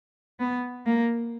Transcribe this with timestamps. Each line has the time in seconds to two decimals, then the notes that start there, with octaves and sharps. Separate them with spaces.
0.40 B3
0.86 A#3